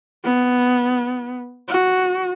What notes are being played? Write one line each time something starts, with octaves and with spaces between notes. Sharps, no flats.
B3
F#4